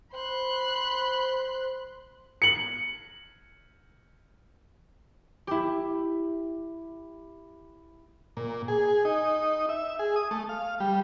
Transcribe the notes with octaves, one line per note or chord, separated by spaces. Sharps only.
C5 B5 C6 F#6
C#7 F#7
E4 G4
A#2
G#4
D#4
E5
G#4
D#6
A3
F5
G3